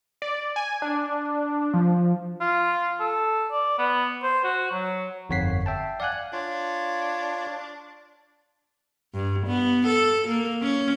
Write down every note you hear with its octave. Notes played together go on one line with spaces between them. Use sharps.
D5
G#5
D4
F3
F4
A4
D5
B3
C5
F#4
F#3
G1 F2 C#5 F#5 B6 C7
E5 G5 A5
D5 F5 F#5 G#5 F#6
D4 F4 C#5
G2
B3
A4
A#3
C#4